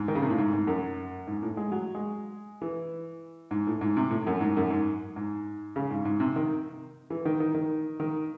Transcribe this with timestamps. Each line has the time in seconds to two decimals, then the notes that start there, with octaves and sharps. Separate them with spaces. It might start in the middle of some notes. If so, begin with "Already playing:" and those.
Already playing: G#2
0.08 D#3
0.15 C#3
0.22 C3
0.30 A2
0.38 G#2
0.53 G#2
0.67 F#2
1.27 G#2
1.43 A2
1.57 G#3
1.72 F#3
1.95 G#3
2.62 E3
3.51 G#2
3.67 A2
3.81 G#2
3.97 C3
4.11 A2
4.27 F#2
4.41 G#2
4.57 F#2
4.70 G#2
5.16 G#2
5.76 C#3
5.90 G#2
6.05 G#2
6.20 C3
6.36 D#3
7.10 E3
7.25 D#3
7.40 D#3
7.55 D#3
8.00 D#3